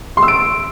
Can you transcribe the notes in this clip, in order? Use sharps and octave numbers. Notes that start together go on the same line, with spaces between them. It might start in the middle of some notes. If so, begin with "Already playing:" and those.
C6
E6
D7